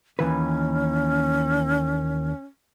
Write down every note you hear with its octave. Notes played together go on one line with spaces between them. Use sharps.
D#2 E3 C#4 B4